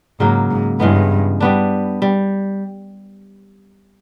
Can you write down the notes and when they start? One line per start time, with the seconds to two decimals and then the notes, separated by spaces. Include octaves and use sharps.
0.20 G#2 C#3 F#3 A#3
0.50 G#2
0.80 G2 C#3 E3 G#3 B3
1.40 G3 B3 D4
2.02 G3